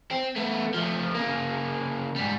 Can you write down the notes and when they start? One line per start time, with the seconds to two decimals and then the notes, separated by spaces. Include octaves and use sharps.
0.11 C4
0.36 A3 B3
0.74 F3 A3
1.15 C#3 A#3
2.16 G#2 G3